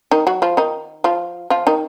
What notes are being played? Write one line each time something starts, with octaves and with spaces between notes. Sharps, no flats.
D#3 D#4
F#3 F#4
F3 F4
D#3 D#4
F3 F4
F3 F4
D#3 D#4